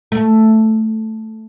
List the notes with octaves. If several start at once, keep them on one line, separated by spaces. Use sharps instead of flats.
A3